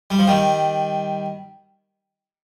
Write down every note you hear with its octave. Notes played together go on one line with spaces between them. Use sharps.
G3
F3
D#3 G3